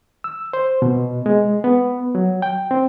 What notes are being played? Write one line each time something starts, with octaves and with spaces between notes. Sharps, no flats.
E6
C5
B2
G#3
B3
F#3
G5
C4